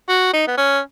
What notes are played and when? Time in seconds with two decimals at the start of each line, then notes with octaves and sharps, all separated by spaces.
0.09 F#4
0.33 D#4
0.48 B3
0.57 C#4